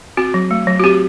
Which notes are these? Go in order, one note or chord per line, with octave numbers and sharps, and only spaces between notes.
C4 F#4
F#3
A3
F#3
F#4
C4 G4